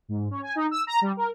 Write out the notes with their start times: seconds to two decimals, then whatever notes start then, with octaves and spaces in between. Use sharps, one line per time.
0.08 G#2
0.31 C#4
0.42 G#5
0.56 D#4
0.71 E6
0.87 A#5
1.01 G3
1.17 A#4